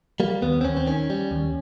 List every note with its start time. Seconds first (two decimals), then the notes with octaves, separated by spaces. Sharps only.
0.20 G3 A#3
0.42 D#2 B3
0.61 C4
0.65 D#2 C#4
0.77 C4
0.87 D#3 C#4
1.10 G3
1.31 D#2